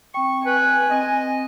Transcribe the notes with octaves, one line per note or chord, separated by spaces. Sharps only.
C4 G5 C#6
B4 G#5
C4 D#5